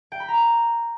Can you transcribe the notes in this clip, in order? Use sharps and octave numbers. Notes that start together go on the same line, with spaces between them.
G5
B5
A#5